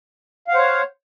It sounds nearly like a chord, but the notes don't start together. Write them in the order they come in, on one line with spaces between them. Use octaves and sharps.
F5 F#5 C5 C#5